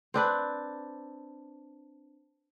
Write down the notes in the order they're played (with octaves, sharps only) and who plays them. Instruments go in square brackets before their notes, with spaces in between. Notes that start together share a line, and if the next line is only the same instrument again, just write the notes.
[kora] C4 D4 B4